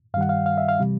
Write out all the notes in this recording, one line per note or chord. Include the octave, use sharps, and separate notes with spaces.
G2 D#3 G3 F5 F#5
F5
F5
E5
F5
C3 E3 G3